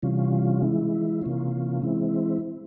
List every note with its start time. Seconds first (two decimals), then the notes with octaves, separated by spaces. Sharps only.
0.02 C3 E3 G3 C#4 F4
0.62 E3 G#3 E4
1.22 C3 E3 A#3 C#4 F4
1.82 E3 G#3 C4 E4